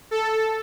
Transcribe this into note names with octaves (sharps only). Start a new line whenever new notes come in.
A4